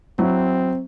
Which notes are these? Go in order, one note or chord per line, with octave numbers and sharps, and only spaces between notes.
F#3 C4 E4